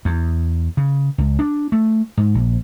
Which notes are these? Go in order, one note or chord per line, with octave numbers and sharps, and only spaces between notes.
E2
C#3
C#2
D4
A3
G#2
A#1